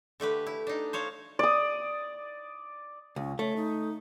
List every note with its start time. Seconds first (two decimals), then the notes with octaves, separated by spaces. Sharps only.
0.20 D3 A3 G4 B4
0.47 E4
0.67 D4 D#4
0.93 C5 C#5 F5
1.39 D5 D#6
3.16 C#2 C#4
3.39 A3 C#5
3.57 D#4